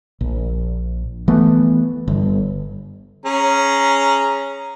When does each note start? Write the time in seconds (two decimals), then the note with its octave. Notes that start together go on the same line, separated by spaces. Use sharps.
0.21 A#1
1.28 E3 A3 B3
2.08 G1
3.26 C#4 G#4 A#5